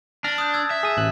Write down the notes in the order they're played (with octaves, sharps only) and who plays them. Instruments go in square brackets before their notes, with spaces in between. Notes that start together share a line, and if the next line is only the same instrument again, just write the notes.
[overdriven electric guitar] D4 [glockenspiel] A5 A6 [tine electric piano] F6 A#6
[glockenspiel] D#6 F#6 G6
E6 G#6
[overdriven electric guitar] E5
[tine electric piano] G#4 D#6
A1 F#6